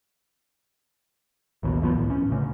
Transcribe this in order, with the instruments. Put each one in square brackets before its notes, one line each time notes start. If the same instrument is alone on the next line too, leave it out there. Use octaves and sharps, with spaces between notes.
[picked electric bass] A1 D#2 B2
G#1 C#2 F3 B3
A2
C#4
D2 C#3